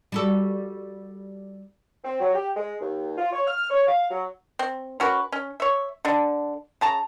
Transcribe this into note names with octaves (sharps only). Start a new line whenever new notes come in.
G3 F#4 A4
C4
F#3
G4
G#3
D#2
F4
C#5
F6
C#5
F5
F#3
C4
C#4 F#4 A#4 B4
C#4
C#5 E5
D3 D4
C#3 A5 A#5